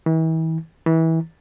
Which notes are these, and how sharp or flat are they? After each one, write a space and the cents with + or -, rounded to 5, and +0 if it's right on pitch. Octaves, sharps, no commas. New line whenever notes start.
E3 -40
E3 -25